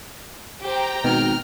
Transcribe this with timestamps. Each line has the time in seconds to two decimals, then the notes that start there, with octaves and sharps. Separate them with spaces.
0.61 G4 C5 G5 A#5
1.04 G#1 B2 F6